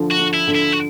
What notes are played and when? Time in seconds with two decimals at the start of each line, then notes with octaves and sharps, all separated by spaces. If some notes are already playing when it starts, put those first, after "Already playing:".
Already playing: D3 F3
0.11 F#4
0.19 D3
0.33 E4
0.48 D3
0.55 E4
0.72 F#4